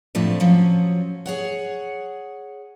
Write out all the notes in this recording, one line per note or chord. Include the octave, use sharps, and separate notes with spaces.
F2 A2 F3 A3 D4
F3 F#3 C#4
G#4 C#5 F#5